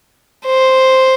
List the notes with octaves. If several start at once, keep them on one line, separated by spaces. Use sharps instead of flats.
C5